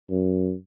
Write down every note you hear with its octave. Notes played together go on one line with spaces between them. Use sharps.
F#2